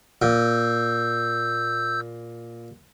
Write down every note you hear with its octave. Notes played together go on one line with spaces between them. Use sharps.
A#2 E6 G6